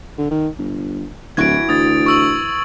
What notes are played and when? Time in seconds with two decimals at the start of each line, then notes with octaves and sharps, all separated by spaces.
0.18 D3
0.31 D#3
0.59 G1
1.37 D1 E3 E4 F#4 G#6 D7
1.69 D2 D#6 A6
2.06 C#6 E6 F#7